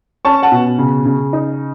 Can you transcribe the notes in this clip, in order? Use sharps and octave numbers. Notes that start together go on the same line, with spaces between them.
C#4 A5 C#6
F#5 A5
B2
C#3
C#3
D#4